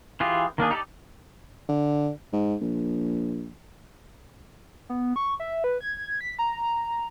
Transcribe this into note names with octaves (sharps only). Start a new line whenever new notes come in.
E3 F4 G4 G#4
D#3 A#3 D4 G#4
D#4 G4 A4 D5
D3
G#2
A#1
B3
C#6
E5
B4
G#6
B6
A#5